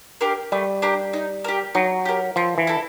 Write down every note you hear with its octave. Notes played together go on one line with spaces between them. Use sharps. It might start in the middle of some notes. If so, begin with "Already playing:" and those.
D4 G4 A#4
G3 A3
D4 G4 A#4
D#4
G4 A#4
F#3 D#4
G4 A#4
F3 C4
E3
E4 A4